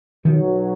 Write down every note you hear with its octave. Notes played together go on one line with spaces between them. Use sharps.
B1 B2 D#3 F3 F#3